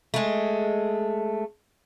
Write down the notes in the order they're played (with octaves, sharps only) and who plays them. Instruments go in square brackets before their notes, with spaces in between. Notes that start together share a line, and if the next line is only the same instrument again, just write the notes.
[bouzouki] G#3 A3